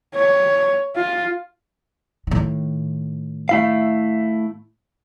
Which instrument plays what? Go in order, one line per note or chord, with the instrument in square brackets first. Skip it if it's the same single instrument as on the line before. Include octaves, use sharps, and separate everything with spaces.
[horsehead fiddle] C#5
F4
[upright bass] A2 D#3
[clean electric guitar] A3 E4 F5